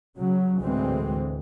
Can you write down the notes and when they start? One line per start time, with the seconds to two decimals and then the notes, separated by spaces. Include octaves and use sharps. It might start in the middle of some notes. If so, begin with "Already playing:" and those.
0.16 C#3 F#3
0.60 D2 A2 E3 G#3 C4